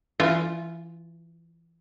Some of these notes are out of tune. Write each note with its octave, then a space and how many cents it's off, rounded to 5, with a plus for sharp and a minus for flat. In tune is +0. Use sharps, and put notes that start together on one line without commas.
E3 +25 F4 +0